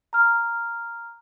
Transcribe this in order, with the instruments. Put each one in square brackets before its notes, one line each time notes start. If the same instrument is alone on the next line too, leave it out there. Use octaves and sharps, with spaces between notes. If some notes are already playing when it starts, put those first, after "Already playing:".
[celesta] A#5 F6